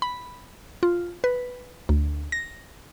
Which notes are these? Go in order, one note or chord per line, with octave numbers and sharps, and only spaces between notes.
B5
F4
B4
D2
A#6